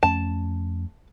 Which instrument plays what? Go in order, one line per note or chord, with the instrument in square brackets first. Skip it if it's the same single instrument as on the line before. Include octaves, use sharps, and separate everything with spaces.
[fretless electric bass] F2 A3 C#4 [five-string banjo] A5